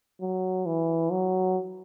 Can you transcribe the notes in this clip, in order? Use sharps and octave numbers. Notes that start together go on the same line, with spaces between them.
F#3
E3
F#3